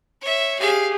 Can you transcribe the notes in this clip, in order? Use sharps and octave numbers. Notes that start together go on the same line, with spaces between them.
C#5 E5
G4 G#4 F5